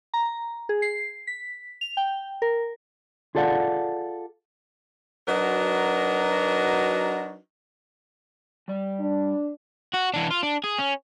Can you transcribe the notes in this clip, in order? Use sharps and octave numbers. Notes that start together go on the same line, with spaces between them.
A#5
G#4
C7
B6
F7
G5
A#4
F4 G#4 A4 D5 F5 F#5
F#3 D4 D#4 F#4 A#4 B4
G3 D5
D4
F#4
E3 D4
F4
D4
G#4
C#4